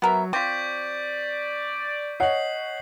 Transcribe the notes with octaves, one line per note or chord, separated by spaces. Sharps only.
F#3 B3 A#4 E5
C4 F4 D5 C#6 G6 B6
C#5 D#5 F#5 C7 F#7